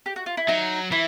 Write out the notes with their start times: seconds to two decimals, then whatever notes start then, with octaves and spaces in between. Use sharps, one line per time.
0.06 G4
0.16 F#4
0.26 F4
0.37 E4
0.48 F#3 D#4
0.92 E3 E4